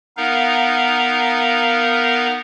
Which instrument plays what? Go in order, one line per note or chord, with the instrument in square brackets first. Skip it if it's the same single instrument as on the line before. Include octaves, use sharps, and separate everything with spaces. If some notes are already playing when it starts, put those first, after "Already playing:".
[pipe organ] B3 D#4 A#4 F5 A#5